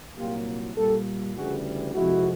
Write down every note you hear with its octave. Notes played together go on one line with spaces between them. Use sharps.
C2 A#2 F#3 A#3 F4 G4
A#2 G3 A#3 G4 A4
D2 C#3 E3 G3 F#4 G#4
F2 C3 F3 G#3 E4 F#4